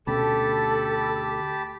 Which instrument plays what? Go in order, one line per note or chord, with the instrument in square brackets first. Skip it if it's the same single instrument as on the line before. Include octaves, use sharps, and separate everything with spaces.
[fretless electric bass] D2 B2 C#4 [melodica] G4 A5 B5 [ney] A4